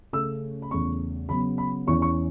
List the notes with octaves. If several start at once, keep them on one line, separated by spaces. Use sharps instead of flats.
C#3 A3 C#4 E6
B5
E2 C#3 A3 C#4 C#6
C#3 F#3 B3 B5
B5
E2 E3 C#4 C#6
C#6